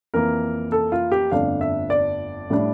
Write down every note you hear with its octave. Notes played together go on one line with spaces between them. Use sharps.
F2 E3 A#3 A#4
A4
F4
G4
G1 F2 D3 A3 D4 F5
E5
D5
A2 G3 D4